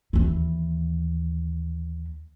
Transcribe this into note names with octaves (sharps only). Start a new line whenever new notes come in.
D#2 E3